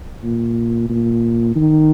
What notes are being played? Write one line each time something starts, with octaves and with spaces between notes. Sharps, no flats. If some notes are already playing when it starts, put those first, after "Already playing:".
A#2
A#2
D#3